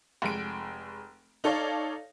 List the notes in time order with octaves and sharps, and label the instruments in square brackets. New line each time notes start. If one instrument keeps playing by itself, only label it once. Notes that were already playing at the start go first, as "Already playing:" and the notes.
[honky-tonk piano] F1 G#3 D7
D#4 A4 C#5 D5 F5